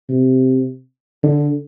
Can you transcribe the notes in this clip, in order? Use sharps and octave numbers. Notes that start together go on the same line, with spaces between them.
C3
D3